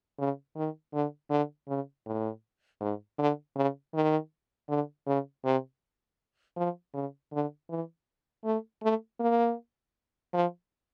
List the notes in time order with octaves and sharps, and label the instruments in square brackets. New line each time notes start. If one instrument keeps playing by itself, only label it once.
[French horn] C#3
D#3
D3
D3
C#3
A2
G#2
D3
C#3
D#3
D3
C#3
C3
F3
C#3
D3
E3
A3
A3
A#3
F3